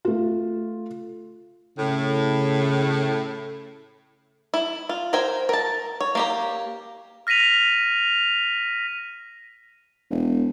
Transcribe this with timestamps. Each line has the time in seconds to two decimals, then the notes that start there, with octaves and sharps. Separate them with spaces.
0.05 A3 F4
1.77 A2 C#3
4.54 E4
4.89 F4
5.13 A#4 C5 G5 G#5
5.49 A#4 A5
6.01 C#5
6.15 A#3 G4 A#5
7.27 F6 A#6 B6 D#7 F7
10.10 E1